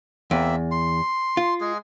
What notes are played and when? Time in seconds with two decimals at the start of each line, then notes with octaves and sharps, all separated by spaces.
0.31 E2 A#3 C4 E5
0.71 C6
1.37 F4
1.61 G#3 G#4